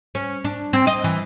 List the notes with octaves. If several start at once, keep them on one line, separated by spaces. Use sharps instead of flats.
C#4
D4
C4
D#5
E3